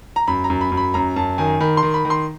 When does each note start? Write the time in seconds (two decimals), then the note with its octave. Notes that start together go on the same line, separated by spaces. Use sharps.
0.16 A#5
0.28 F#2 B5
0.44 A#5
0.50 F#2
0.61 B5
0.72 F#2
0.77 B5
0.94 F#2 A#5
1.16 F#2 A5
1.38 D#3 G#5
1.60 D#3 B5
1.77 C6
1.83 D#3
1.94 B5
2.05 D#3
2.10 C6